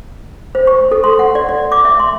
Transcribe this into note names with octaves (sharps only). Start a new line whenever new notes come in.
C5
C#6
A4
C6
F#5
D5
D5
D6
E5
C6